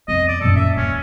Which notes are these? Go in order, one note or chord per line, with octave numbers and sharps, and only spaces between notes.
F2 B3 D#5
D5
F#2 A#2 A4
E5
D#2 C#4